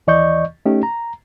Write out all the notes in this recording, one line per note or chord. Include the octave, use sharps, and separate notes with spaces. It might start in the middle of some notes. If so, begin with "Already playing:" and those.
D#2 E3 D5 D#5 C#6 G6
A3 C#4 D#4 G4
A#5